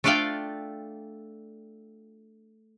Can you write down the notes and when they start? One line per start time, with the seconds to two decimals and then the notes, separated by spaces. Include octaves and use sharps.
0.04 A3 D4 F4 D5 F5 G5